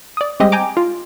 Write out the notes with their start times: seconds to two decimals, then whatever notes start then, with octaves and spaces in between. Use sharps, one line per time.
0.17 D5 D#6
0.40 G3 G#3 C4 G4 D#5
0.52 G5 G#5 A#5 D6 D7
0.77 F4